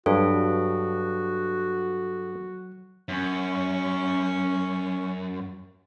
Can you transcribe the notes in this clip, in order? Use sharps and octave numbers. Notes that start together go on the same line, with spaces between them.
G2 F#3 F#4 A4
F#2 C#4 C#6